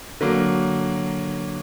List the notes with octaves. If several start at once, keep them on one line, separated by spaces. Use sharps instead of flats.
D3 F#3 A#3